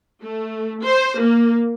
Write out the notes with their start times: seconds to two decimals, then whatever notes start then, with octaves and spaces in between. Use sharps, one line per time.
0.24 A3
0.85 C5
1.20 A#3